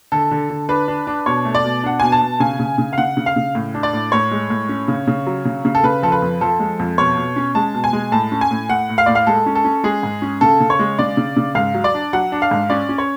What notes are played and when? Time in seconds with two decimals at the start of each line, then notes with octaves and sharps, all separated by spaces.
0.12 D3 A4
0.31 D3
0.50 D3
0.69 D4 B4
0.88 D4
1.07 D4
1.26 B2 C#5
1.45 A3
1.55 D5
1.64 B2
1.84 D4 F#5
2.00 B2 G#5
2.12 A5
2.21 B2
2.40 C#3 G#5
2.60 C#3
2.78 C#3
2.93 F5
2.98 C#3 F#5
3.17 C#3
3.26 F5
3.36 C#3
3.55 A2
3.74 D4
3.83 D5
3.93 A2
4.12 A2 C#5
4.31 G#3
4.50 A2
4.69 C#4
4.88 C#3
5.08 C#3
5.27 F#3
5.45 C#3
5.65 C#3
5.75 A4
5.84 C#3 B4
6.03 F3 A4
6.12 B4
6.22 F2
6.41 F3 A4
6.60 G#3
6.79 F2
6.98 B2 C#5
7.17 B2
7.36 C#4
7.55 G#3 A5
7.74 B2
7.84 G#5
7.93 G#3
8.12 A2 A5
8.32 C#4
8.41 G#5
8.51 A2
8.69 A2 F#5
8.89 A2
8.98 F5
9.06 A2 D5
9.15 F5
9.27 G#3 A4
9.46 C#4
9.55 A4
9.65 C#4
9.84 G#3 G#4
10.03 G#2
10.22 C#4
10.41 C#3 A4
10.60 C#3
10.70 C#5
10.79 G#3
10.99 C#3 D5
11.17 C#3
11.37 C#3
11.55 G#2 F5
11.74 F#3
11.84 D5
11.94 D4
12.13 F#3 F#5
12.32 D4
12.42 F5
12.51 G#2
12.70 C#4 D5
12.89 C#4
12.98 C#5